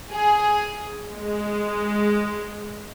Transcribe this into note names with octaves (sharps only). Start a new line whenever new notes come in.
G#4
G#3